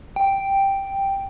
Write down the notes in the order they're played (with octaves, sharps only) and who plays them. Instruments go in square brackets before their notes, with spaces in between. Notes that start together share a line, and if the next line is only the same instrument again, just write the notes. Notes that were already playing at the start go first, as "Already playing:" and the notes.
[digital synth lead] G5